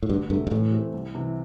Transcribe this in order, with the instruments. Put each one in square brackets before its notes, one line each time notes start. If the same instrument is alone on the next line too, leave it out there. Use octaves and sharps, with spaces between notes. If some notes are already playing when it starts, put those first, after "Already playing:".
[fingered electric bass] A2
[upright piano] D2 [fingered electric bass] G2
[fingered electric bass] G2 [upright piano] C3 A3
[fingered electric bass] G2
[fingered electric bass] A2 [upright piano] E3
[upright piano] A3 C4 G4
C2
C3 E3